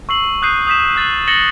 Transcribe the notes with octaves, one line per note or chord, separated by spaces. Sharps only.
C#6 E6 C7 F#7
D#6 F#6 G6 C7 D#7
D#6 G6 B6 E7
F#6 A6 F#7
A6 A#6 C#7 E7 F#7 G7